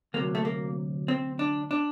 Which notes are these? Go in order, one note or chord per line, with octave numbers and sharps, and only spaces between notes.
D2 C3 F#3 A#3
A3
A#3
C4
D4
D4